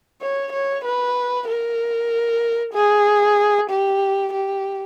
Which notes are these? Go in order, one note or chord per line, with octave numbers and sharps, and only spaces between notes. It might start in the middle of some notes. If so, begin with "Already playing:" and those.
C#5
C#5
B4
A#4
G#4
G4
G4